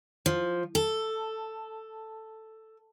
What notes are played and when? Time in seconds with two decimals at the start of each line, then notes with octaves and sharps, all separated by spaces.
0.26 F3
0.75 A4